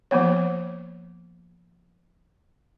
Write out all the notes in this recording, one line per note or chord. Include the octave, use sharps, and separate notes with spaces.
F3 A#3 B3 C#5